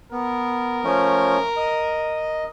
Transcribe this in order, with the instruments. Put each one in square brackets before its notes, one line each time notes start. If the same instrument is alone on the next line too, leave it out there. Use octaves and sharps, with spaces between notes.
[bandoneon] B3 [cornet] A#4
[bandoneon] F3 A3 C#4
D#5